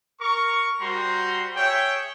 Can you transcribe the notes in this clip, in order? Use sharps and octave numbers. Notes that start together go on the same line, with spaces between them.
A#4 C#6
G3 F#4 C5 A#5 C6
G#4 C#5 E5 G5